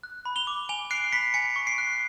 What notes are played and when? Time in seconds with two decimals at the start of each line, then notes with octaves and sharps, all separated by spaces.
0.03 F#6
0.25 B5
0.36 F7 G7
0.47 D6
0.69 G#5 F7 G7
0.91 F#6 C7 D7
1.13 B5 B6 C#7
1.34 G#5 B6 C#7
1.56 C#6
1.67 C7 D7
1.78 F#6